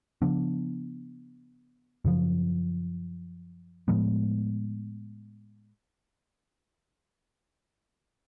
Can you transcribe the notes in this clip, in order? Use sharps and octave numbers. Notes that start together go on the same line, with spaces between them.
C#3 F3 B3 D4
F#2 C#3 F3
A2 F3 G#3 B3